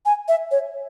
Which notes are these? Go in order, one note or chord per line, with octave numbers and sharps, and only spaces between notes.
G#5
E5
C#5